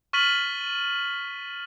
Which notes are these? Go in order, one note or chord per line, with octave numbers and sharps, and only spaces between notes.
C#6 F6 A6 B6 D#7 F#7